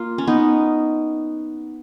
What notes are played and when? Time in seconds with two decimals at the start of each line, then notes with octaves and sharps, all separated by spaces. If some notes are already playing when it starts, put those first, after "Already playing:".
Already playing: A#3 F4
0.18 C#4
0.27 B3 D#4